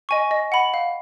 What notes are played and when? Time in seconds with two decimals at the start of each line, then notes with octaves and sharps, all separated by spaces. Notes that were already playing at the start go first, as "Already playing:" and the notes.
0.09 D#5 G#5 C#6
0.31 D#5
0.52 F#5 B5
0.74 F5